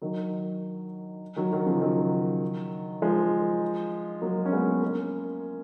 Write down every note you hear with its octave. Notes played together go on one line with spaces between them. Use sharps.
D#3 F#3
D#3 F#3
D#3 F#3
C#3 F3
D#3 F#3
F3 G#3
F#3 A#3
C#4
G#3 B3
A#3 C#4